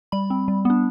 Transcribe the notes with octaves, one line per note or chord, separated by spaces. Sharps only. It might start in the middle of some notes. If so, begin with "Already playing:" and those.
G3 B5
C4
G3
B3 D4